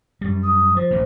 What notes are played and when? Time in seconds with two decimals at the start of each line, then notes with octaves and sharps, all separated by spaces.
0.21 F#2 G3
0.43 D#6
0.76 F3 C5
0.91 A1 A#2